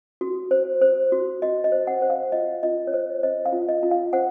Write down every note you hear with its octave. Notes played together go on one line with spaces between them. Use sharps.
F#4
C5
C5
F#4
F#4 D#5
D#5
C5
F#5
C5
F5
F4 D#5
F4 D#5
C#5
C5 D#5
C5 D#5
F5
F4
D#5
F4
F5
C5 F#5